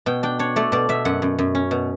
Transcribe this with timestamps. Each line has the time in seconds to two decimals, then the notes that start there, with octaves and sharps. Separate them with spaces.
0.06 B2 G5
0.23 D4 G5
0.39 D4 C#5
0.56 A3 D5
0.72 B2 D5
0.89 B2 E5
1.05 F#2 F#5
1.22 F#2
1.39 F#2
1.55 C#4
1.71 B2